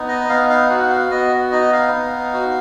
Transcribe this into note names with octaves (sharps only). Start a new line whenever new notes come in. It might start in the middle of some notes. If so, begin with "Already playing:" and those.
Already playing: B3 D#4
D#5
B3 F5
F5
F#4 F#5
F5
B3 D#5
D#4 D#5
F5
B3
F#4